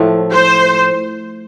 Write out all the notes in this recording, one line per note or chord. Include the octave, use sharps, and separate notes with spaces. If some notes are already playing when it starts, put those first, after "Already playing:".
Already playing: A2 F3 A3
C5